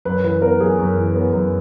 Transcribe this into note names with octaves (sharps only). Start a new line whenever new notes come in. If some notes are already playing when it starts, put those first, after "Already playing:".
F#2 B4
E3 B4
B3 A#4
F#2 G#4
F#2
E3
B3
F#2